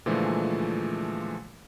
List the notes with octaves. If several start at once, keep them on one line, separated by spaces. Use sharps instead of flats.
A#2 D3 E3 F3 G#3 A3